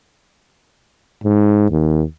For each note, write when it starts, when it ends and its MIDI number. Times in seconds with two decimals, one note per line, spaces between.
1.24 1.69 44
1.71 2.03 39